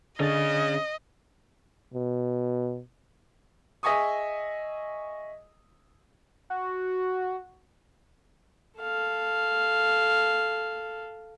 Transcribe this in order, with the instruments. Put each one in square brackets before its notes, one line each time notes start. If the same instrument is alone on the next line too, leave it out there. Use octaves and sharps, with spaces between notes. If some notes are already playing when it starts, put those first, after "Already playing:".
[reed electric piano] D3 D4 A6 [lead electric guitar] C#4 G#4 [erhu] D#5
[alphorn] B2
[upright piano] G#4 D#5 E5 G#5 C#6 D#6
[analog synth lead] F#4
[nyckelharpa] A4 F5